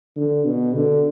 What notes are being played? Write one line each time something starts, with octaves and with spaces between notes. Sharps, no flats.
D3
B2
D3